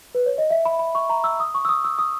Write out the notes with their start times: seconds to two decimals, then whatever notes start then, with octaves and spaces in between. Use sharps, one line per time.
0.15 B4
0.26 C#5
0.38 D#5
0.50 E5
0.65 B5
0.79 B5
0.95 C#6
1.10 A#5
1.24 E6
1.40 D#6
1.55 C#6
1.65 E6
1.69 D#6
1.84 E6
1.99 D#6